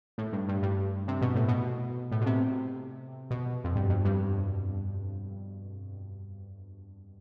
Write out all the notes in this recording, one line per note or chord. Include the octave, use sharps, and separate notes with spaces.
A2
G2
G2
G2
C3
B2
A2
B2
A2
B2
C3
B2
F2
G2
F2
G2